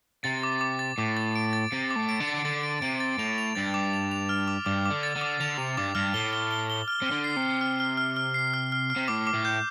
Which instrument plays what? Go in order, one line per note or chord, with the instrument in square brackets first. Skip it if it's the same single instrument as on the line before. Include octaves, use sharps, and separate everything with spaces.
[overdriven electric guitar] C3 [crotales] A6
[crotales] D6
D6
A6
[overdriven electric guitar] A2 [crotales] D6
[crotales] A6
D7
A6
[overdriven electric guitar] C3 [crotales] D7
[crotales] D6
[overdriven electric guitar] A2
[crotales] D7
[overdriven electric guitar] D3
[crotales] A6
[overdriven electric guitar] D3 [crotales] A6
[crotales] D7
[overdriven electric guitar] C3 [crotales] D7
[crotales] A6
[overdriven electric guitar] A2 [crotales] F7
[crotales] F7
[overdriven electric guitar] G2 [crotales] A6
[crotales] D6
F7
F7
F6
D6
[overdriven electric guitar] G2 [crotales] D6
[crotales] D6
[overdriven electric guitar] D3
[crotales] A6
[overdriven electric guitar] D3
[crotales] D6
[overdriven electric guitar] D3 [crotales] F7
[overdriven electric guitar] C3 [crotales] F7
[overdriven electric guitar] G2 [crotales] D6
[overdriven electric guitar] G2 [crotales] F6
[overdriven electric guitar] A2 [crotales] G7
[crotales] G7
G7
G7
F6
[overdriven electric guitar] C3 [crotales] F6
[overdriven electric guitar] D3
[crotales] C7
[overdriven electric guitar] C3
[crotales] C7
F6
F6
F6
F6
C7
F6
F6
F6
[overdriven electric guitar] C3
[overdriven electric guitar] A2 [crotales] D6
[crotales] D6
[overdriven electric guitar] A2
[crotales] G6